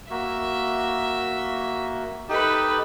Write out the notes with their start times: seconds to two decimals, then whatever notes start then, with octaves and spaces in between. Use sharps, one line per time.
0.10 A#3 F#4 E5
2.29 D#4 G4 A4 B4